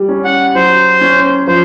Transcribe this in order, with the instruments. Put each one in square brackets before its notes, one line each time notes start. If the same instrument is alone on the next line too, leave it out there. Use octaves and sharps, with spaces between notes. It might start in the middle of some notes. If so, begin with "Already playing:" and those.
Already playing: [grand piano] G3
C#4
[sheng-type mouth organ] F#5
[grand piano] F#3 [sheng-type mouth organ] C5
[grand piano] C#4
[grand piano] F3 [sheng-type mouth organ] C5